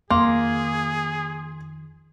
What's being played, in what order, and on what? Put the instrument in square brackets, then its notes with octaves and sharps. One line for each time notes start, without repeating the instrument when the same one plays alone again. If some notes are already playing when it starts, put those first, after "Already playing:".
[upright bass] F2 D#3 [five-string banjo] A#3 [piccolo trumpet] G#4 [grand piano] C6